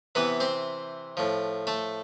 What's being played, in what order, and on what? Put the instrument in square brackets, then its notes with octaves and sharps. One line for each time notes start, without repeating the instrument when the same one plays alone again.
[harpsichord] C3 E3 B3 B4
C4 C5
A2 F3
A3 A4